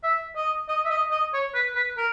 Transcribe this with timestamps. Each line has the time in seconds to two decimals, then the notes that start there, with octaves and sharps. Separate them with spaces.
0.03 E5
0.36 D#5
0.69 D#5
0.85 E5
0.90 D#5
1.11 D#5
1.33 C#5
1.54 B4
1.75 B4
1.97 A#4